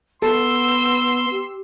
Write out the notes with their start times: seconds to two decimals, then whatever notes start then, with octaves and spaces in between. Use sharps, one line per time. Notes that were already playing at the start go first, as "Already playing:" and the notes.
0.22 B3 A4 C6 E6
1.30 G4